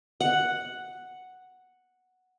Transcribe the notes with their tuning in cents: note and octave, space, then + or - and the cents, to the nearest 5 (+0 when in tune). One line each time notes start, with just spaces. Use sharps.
F#5 +0